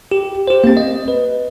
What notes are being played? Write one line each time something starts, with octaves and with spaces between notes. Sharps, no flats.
G4
G4 C5
A#3 C4
D#5
B4